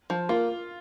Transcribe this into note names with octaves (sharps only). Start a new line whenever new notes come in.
F3
A#3 F4